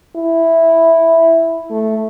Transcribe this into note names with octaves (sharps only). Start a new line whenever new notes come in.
E4
A3